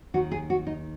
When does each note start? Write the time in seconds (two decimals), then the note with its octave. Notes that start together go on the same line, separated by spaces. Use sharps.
0.14 D#2 D#3 F#4
0.32 G#4
0.50 F#4
0.67 D#4